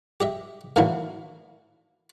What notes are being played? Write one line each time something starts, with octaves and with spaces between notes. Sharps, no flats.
G4 D#5 E5
A2 D3 E3 F#3 A#3 E4